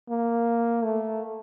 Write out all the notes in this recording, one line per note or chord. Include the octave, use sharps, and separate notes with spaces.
A#3
A3